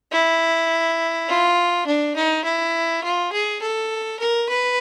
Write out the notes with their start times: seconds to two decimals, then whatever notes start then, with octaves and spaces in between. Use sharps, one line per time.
0.12 E4
1.29 F4
1.87 D4
2.16 D#4
2.44 E4
3.04 F4
3.32 G#4
3.62 A4
4.20 A#4
4.49 B4